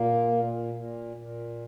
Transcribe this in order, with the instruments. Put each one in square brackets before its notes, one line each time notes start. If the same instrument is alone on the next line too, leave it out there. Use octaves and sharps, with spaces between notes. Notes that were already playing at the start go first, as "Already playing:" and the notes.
Already playing: [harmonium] A#2 A#3
A#2
A#2
A#2